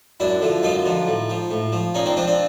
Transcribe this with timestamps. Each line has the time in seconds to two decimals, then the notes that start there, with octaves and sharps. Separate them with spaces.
0.20 F#2 D4 E4
0.41 D3 F3
0.63 F#2 D#4 F4
0.86 D3 F3
1.07 A2
1.30 F3
1.51 A2
1.72 F3
1.94 A#2 C#4 D#4
2.06 C4 D4
2.16 F3 C4 D4
2.27 C4 D4